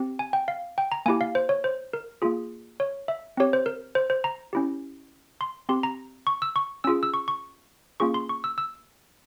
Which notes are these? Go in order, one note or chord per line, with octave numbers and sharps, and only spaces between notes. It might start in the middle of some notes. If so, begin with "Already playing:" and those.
Already playing: C4 G4
G#5
G5
F5
G5
A#5
A#3 E4 G4 G#5
F5
C5
C#5
C5
A#4
A#3 F4 G#4
C#5
E5
C4 G4 C#5
C5
A#4
C5
C5
A#5
C#4 E4 G4
C6
C4 G4 C6
A#5
C#6
E6
C#6
C#4 F4 G#4 E6
E6
C#6
C#6
A#3 C#4 F4 G#4 C#6
C6
C#6
E6
E6